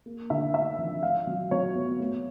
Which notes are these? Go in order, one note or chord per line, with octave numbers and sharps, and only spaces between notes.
A#3
D3 E5
D#4 E5
F3
D4 F5
F#3
F#3 C#5
B3
A3